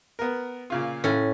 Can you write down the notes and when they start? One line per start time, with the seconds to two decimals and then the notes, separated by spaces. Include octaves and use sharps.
0.19 B3 A#4
0.70 A#2 C#3 F4
1.04 A2 C#4